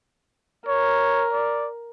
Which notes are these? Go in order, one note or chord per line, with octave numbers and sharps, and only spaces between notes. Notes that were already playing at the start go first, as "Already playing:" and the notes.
A#4 C#5
D5